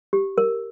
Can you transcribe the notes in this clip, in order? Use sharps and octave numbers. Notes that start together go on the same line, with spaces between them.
G4
A#4